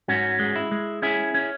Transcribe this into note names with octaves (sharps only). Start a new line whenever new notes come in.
G#2 C#4 F#4
G#3
E4
G#3
C#4 E4 G#4
C#4